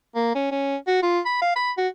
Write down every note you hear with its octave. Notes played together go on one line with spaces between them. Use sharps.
A#3
C#4
C#4
F#4
F4
B5
F5
B5
F#4